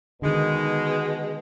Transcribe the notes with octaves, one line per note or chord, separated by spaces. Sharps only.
B2 D3 D#3 G#3